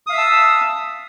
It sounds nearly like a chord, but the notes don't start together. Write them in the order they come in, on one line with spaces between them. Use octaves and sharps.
D#6 F5 E5 E6 A5